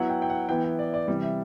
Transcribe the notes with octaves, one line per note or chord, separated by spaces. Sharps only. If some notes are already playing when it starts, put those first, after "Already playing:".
Already playing: F#3 B3 E4 F#5
G5
G5
F#5
E3 B3 E4 G5
G5
D5
D5
C3 E3 G3
E5